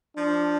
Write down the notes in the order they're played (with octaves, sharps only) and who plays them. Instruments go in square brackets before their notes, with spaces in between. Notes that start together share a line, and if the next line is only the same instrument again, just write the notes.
[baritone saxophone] F3 [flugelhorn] D4